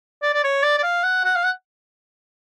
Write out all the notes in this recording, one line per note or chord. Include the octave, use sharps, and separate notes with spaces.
D5
D5
C#5
D5
D5
F5
F#5
F#5
F5
F#5